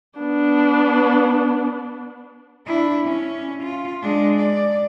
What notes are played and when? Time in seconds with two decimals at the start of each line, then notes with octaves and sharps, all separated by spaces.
0.19 B3 D4
2.66 D4 E4
3.05 C#4
3.63 F4
4.02 G#3 D4
4.39 D5